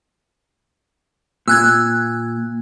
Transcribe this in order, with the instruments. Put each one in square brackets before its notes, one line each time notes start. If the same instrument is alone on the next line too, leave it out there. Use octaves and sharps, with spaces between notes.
[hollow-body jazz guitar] A#2 [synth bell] E6 F#6 G#6